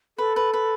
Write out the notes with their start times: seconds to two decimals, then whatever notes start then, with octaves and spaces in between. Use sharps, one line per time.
0.18 A4 B4
0.36 B4
0.54 B4